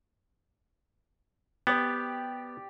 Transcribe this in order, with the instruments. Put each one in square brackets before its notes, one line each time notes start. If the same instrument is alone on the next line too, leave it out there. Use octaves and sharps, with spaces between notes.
[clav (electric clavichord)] B3 [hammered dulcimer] G4 D5